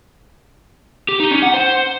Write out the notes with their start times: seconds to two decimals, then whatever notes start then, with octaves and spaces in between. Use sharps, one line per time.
1.09 G4
1.20 D#4
1.31 C#4
1.42 F#5
1.54 C5